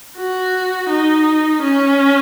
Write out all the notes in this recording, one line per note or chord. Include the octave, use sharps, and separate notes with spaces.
F#4
D#4
C#4